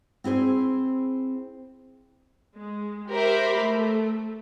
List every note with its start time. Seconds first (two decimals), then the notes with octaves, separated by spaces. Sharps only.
0.24 C4 E4 G#4 C5
2.56 G#3
3.10 G4 A#4 C5 E5 B5 D6
3.61 A3